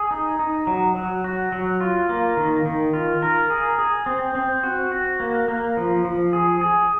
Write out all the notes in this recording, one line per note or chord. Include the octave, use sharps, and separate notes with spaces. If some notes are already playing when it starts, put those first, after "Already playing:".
Already playing: G#4
D#4
D#4
F#3
F#3
F#4
F#3
F4
A#3
D#3
D#3
F4
A#4
G#4
G#4
C4
C4
F#4
F#4
A#3
A#3
F3
F3
G#4
G#4